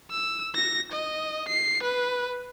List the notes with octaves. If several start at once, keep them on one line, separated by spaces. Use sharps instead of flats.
E6
A#6
D#5
C7
B4